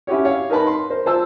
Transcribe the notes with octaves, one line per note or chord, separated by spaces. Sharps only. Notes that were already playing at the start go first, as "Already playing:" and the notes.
C#4 E4 F#4 G4 C#5
C#5 F5
D#4 A#4 B4 A5 B5
C6
A#4 C5
F4 C5 A5 E6